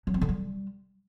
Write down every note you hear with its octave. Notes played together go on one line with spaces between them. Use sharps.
F#3
C4
D3
G3